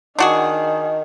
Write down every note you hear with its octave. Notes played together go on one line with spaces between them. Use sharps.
D#3 D4 F#4 G#4